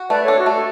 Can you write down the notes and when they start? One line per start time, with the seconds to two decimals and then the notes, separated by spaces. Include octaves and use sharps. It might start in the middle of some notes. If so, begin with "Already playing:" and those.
Already playing: F#4
0.09 A3 B4 D5
0.23 D4 A4 C#5
0.37 F#4
0.46 A3 A4